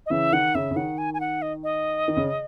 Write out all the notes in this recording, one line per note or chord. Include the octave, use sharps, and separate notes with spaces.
D#5
C#3 E3 E5
D#3 F#5
C#3 E5
C#3
D#3 F#5
G#5
G#5
F#5
D#5
D#5
D#3
C#3